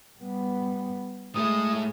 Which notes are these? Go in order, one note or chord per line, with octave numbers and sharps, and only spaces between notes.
G3 B3
A2 G#3 A3 D#6